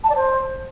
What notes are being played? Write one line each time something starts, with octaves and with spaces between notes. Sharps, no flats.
A5
D5
C5